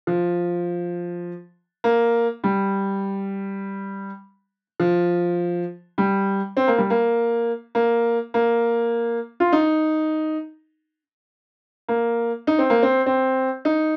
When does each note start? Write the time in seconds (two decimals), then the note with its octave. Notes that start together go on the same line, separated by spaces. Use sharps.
0.07 F3
1.84 A#3
2.44 G3
4.80 F3
5.98 G3
6.57 C4
6.68 A#3
6.78 G3
6.90 A#3
7.75 A#3
8.34 A#3
9.40 F4
9.52 D#4
11.88 A#3
12.47 D#4
12.59 C4
12.70 A#3
12.83 C4
13.06 C4
13.65 D#4